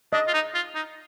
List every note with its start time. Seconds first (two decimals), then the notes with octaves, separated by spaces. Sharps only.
0.13 D4 D#5
0.28 F4
0.34 D#4
0.55 F4
0.75 D#4